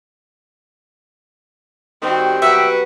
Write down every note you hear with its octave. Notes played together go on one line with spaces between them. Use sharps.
D#3 G3 C4 F#4
B2 F#3 F#4 B4 E5 G5